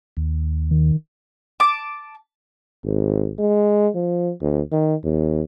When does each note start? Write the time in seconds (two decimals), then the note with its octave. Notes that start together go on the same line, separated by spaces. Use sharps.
0.17 D#2
0.71 D#3
1.60 A5 D6
2.84 G#1
3.39 G#3
3.95 F3
4.41 D2
4.72 D#3
5.04 D#2